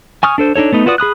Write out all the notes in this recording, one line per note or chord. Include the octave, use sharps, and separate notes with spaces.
G#5 C#6 D#6 F6
D4 A4 C5
D4 D#4 A4 C#5
A3 B3 D#4
F4 F#4 B4 D5 D#6
G#4 B5 D#6 F#6